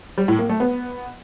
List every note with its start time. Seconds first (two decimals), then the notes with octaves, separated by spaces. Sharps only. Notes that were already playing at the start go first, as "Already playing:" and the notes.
0.18 G3
0.28 A2
0.39 A#3
0.49 A3
0.60 B3